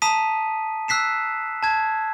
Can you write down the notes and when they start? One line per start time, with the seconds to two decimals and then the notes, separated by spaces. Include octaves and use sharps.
0.02 A5 A#5 D#6 B6 D#7
0.88 E6 F#6 B6 C7 E7
1.63 A5 G#6